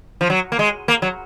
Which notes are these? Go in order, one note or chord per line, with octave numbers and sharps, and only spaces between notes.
F3
F#3
A#3
G#3
A#3
F#3